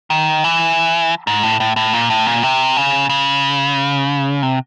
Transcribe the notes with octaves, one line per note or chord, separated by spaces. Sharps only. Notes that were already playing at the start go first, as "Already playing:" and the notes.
D#3
E3
G#2
A2
A2
A2
A#2
A2
A#2
C3
C#3
C#3
C3